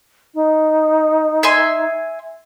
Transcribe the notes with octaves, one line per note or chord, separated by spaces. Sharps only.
D#4
E5 G#5 C6